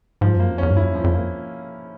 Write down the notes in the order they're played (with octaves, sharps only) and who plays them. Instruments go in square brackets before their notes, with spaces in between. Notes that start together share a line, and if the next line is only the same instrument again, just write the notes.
[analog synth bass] G#2 [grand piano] F3
[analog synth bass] F#2 [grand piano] A#3
[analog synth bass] F2
[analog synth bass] E2 [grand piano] C#4
[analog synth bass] G2
[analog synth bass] F#2 [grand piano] E4
[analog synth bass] F2 [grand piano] F3
[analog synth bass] F2
[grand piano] A#3